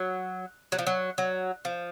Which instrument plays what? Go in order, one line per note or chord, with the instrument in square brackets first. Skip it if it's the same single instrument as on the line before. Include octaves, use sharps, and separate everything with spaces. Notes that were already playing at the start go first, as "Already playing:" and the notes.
Already playing: [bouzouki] F#3
F#3
F3
F#3
F#3
F3